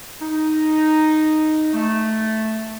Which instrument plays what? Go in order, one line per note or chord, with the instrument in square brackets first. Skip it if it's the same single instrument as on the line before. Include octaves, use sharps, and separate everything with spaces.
[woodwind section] D#4
A3